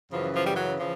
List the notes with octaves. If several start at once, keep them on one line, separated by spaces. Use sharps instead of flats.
F#2 C#3 E3 F3
F3
G3
F#3
C#3 E3 F3